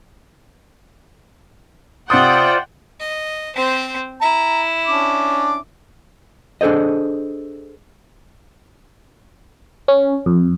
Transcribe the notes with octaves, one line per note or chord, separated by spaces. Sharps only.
C3 F4 C5 D5 F#5 G5 D#6
D#5
C4 C5
E4 A#5
C#4 D4 D6
D4 G#4 A4 C5 D#5
C#4
F2